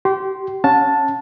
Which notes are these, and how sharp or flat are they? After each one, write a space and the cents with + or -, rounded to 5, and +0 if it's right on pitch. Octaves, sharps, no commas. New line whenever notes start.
G4 -30 C6 +0
C#4 +0 F#5 -35 A5 +0